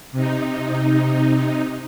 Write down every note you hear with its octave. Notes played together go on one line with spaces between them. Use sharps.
C3 D#4